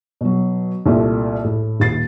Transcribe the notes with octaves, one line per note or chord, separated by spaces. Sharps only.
B2 F#3
C2 A#2 A3
A2
D#1 A6 C7